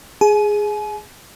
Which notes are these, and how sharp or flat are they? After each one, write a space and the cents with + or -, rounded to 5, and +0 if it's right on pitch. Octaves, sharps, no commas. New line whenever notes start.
G#4 +0 G#5 +40